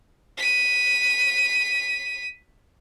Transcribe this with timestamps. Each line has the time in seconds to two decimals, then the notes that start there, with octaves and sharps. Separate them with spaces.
0.38 B6 D#7